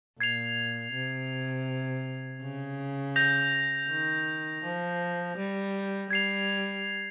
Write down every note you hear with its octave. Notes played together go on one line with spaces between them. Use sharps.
A#2 G#6 C7 F7
C3
C#3
G6 A#6 F7
D#3
F3
G3
G3 G#6 C7 F7